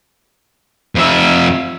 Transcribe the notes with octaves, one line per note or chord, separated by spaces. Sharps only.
F2 E5